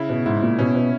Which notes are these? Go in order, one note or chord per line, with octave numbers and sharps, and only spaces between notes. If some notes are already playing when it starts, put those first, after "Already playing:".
Already playing: C#3 E4
B2
G#2 E4
A#2
B2 C#4
B2